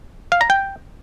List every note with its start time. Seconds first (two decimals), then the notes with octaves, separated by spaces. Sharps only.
0.32 F5
0.41 A#5
0.50 G5